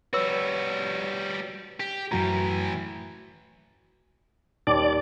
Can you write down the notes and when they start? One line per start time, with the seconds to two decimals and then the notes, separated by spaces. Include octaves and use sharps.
0.13 G3 F#4 B4 C#5 E6
1.80 G4
2.12 F#2 A2 E3 F#4 A#5
4.67 D#2 D5